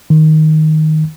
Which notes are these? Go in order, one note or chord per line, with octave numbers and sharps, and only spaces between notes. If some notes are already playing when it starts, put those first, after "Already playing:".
D#3